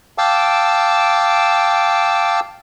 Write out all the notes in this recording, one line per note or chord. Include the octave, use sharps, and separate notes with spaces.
F5 G5 A5 D6 E6